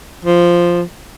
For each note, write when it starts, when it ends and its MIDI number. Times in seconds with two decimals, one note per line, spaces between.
0.25 0.82 53